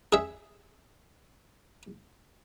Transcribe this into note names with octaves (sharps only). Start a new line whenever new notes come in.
G#4 E5